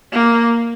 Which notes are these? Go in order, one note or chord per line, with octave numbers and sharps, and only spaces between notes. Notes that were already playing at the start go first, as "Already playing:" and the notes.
A#3